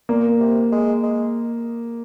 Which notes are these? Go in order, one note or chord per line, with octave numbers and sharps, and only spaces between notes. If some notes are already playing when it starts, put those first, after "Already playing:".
A#2 A#3
C3
G#3
G#3